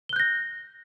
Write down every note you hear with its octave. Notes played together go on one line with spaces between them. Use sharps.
F#6 G6 A#6 G7